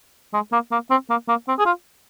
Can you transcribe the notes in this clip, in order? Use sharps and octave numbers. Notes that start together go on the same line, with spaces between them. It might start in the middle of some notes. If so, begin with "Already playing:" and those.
G#3
A#3
A#3
C4
A#3
A#3
C4
G#4
F4